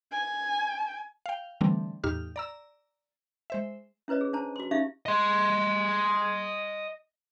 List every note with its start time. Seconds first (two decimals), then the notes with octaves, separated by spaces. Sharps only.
0.12 G#5
1.26 F5 G5
1.61 D3 E3 G3 A3 C4 D4
2.04 E2 A2 D#4 G4 F6
2.36 D5 A#5 E6
3.50 G#3 C5 E5
4.08 C#4 E4 B4 C#5 D#5
4.21 G#4
4.33 D4 C5 A5 A#5
4.56 F#4 C6
4.71 C#4 D#4 G4 E5 F5
5.06 D#5 C6